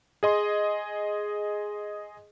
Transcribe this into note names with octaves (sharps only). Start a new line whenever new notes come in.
G#4 D#5 C6 D#6